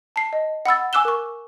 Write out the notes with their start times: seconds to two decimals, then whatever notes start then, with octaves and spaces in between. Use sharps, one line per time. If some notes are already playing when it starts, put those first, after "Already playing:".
0.16 A5 C7
0.33 D#5
0.66 F#5 B5 E6 A6
0.93 G#5 D6 E6 F#6 E7 G7
1.05 A#4 C#6